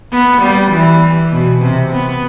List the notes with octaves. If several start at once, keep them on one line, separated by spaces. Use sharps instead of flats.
B3
G3
E3
B2
C3
B3